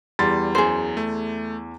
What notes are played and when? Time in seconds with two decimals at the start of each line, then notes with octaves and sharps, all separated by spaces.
0.19 E2 G3 C6 A6
0.55 F#2 G#4 C5
0.97 A3